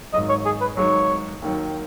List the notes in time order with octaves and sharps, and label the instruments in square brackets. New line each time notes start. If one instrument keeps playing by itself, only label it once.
[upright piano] G#1 G#2 F#3 [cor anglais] D#5
[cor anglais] C#5
G#4
B4
[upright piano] G#1 G#2 F#3 [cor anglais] C#5
[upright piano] D#2 D#3 F#3